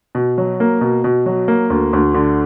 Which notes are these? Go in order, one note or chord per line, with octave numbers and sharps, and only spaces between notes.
B2
F#3
A#3
B2
B2
F#3
A#3
D2
D2
D3